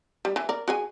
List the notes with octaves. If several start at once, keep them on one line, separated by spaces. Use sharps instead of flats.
G3
E3
A#4 D5
F#4 G#4 G#5